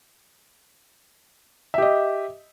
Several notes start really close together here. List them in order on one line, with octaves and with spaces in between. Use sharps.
E5 G4 D#5